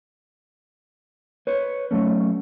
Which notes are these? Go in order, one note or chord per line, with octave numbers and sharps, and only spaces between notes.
B4 C#5
F#3 A3 C#4